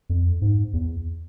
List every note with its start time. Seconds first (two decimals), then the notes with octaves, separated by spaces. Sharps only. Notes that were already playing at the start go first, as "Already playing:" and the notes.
0.10 F2
0.42 G#2
0.73 E2